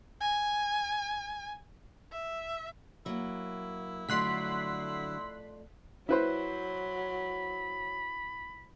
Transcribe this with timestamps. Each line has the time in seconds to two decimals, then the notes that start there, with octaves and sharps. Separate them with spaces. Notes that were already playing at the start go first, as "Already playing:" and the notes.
0.21 G#5
2.12 E5
3.06 F#3 A#3 E4
4.09 F2 D3 F#3 A3 D5 C6 F#6 B6
6.09 F#3 E4 B4 C5 B5